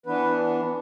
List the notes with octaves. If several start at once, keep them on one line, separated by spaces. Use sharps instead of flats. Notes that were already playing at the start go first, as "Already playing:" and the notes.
E3 B3 D4 B4